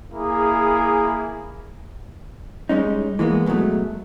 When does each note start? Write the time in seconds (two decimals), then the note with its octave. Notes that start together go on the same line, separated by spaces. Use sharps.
0.12 A#3 E4 G#4
2.69 G3 G#3 C#4 D#4
3.19 E3 G#3 A#3 B3
3.46 G#2 B2 D3 F#3 A3